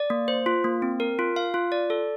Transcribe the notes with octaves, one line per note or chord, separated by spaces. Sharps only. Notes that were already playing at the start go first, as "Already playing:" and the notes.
Already playing: D5
A#3
C5
F4
A#3
C4
A#4
F4
F5
F4
D5
A4